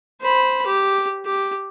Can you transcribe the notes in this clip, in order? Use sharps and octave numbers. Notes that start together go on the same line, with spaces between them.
C5 B5
G4
G4